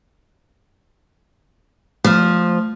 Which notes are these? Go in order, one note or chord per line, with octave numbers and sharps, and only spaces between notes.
F3 A3 F6